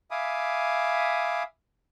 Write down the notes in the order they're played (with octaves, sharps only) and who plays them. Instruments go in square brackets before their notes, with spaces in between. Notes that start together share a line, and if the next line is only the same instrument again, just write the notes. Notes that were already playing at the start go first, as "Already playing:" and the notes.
[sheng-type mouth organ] E5 F5 G#5 B5 D6 D#6